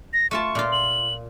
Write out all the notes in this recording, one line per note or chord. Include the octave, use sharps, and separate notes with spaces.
A#6
A3 F4 A5 C#6
A#2 F4
F#7